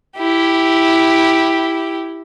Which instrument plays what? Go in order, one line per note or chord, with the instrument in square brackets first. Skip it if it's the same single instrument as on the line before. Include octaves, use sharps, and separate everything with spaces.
[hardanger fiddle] E4 G4